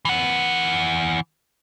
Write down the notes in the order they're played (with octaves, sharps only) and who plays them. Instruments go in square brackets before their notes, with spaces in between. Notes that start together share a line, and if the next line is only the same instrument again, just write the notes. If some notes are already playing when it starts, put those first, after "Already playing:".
[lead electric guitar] E3 F#5